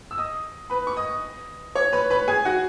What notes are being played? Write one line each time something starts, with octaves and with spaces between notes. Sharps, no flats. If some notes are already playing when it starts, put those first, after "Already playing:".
E6
D#5 D#6
B4 B5
C#6
D#5 D#6
C#5 C#6
B4 B5
B4 B5
G#4 G#5
F#4 F#5